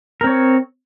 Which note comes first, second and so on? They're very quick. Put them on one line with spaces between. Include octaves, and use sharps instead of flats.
A#4 C4 C#5